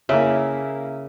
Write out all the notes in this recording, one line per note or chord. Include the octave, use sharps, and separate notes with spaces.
C#3 A#3 E4 E5